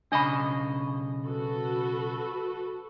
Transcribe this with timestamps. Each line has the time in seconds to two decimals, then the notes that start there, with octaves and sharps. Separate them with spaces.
0.12 B1 C#3 D4 D#5 B5
1.26 F#4 A4 B4